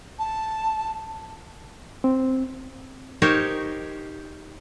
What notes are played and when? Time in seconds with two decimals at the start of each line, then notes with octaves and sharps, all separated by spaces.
0.19 A5
2.04 C4
3.22 D#4 G4 A#4 C5 C#5